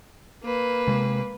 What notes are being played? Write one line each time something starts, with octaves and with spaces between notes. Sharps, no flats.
A#3 B4
C3 G#3